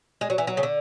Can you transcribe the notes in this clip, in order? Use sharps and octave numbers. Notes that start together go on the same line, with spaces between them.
G#3
F#3
E3
F#3
C#3
D3